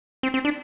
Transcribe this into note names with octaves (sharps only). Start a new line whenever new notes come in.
C4
C4
D4